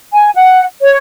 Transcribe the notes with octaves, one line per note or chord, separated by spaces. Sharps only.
G#5
F#5
C#5